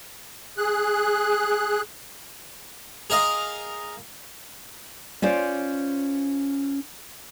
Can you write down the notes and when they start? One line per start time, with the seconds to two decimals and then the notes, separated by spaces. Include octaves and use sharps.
0.58 G#4 F#6
3.10 G#4 A#4 D#5 F5
5.22 C#4 F4 C5 D5